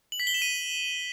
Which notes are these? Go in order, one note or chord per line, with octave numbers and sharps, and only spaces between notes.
F#7
B6
G7
E7
D#7